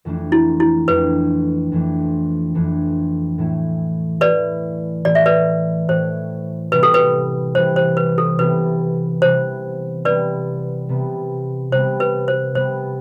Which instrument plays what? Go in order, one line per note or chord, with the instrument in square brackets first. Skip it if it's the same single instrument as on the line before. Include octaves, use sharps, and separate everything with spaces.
[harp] F2 E3 A3 D4
[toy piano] E4
E4
[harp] F2 E3 A3 D4 [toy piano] B4
[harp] F2 E3 A3 D4
F2 E3 A3 D4
A2 E3 A3 E4
[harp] A2 E3 A3 E4 [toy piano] B4 D5
[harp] A2 E3 A3 E4 [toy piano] D5
[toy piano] E5
B4 D5
[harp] A2 E3 A3 E4 [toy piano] C5
[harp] C3 E3 G3 B3 [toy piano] B4
[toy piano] A4
B4
[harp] C3 E3 G3 B3 [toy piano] C5
[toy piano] C5
B4
A4
[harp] C3 E3 G3 B3 [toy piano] B4
[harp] C3 E3 G3 B3 [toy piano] C5
[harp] C3 G3 B3 [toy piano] B4 D5
[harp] C3 G3 B3
[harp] C3 G3 B3 [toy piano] C5
[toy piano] B4
C5
[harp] C3 G3 B3 [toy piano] C5